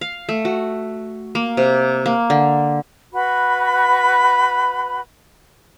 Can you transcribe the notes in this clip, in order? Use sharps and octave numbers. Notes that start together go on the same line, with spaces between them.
F5
A3
F#4
A#3
C3
A#3
D3
F#4 B4 B5